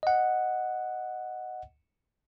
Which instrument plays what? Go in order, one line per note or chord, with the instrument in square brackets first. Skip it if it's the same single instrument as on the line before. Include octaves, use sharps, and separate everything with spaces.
[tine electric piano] D#5 F#5